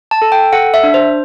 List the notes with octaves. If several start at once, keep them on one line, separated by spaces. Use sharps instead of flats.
A5
A4
G5
A4 F#5
E5
D4
C5